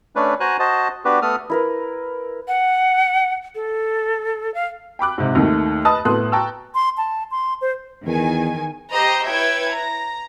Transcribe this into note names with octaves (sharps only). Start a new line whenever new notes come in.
A3 C#4 D4 B4
F#4 C5 G#5 A#5 F#6
F#4 C5 D#5 A5
B3 D4 F#4 G4 B4
A3 B3 A4 D#6 F6
E4 A#4 B4
F#5
A4
F5
G5 B5 D6 F#6
G#2 C3
D#2 D#3 A3
B4 D#5 A5 D#6 F#6
A2 B3 A4 C6 D#6 F#6
G5 A5 A#5 C#6 E6
C6
A5
C6
C5
E2 D#3 G#5
G4 C5 D#5 A#5
E4 B4 C#5 E5 G5 G#6
A#5